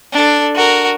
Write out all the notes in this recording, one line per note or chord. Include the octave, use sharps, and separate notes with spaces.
D4 A4
F#4 A#4